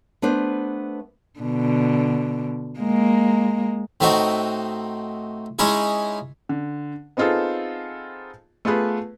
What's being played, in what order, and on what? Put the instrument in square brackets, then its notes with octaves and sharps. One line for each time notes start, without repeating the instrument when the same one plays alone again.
[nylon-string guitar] A3 B3 D4 B4 C5
[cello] B2 D3
G#3 A#3
[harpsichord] A2 A3 C4 D#4 F#4
G#3 C#4 D#4 E4 G#4
[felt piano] D3
B3 C4 D#4 F4 G#4 A4
A3 B3 F4 G#4 B4